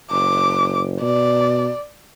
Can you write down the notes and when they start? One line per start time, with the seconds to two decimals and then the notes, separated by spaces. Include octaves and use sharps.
0.11 F#1 D6
1.01 B2 D5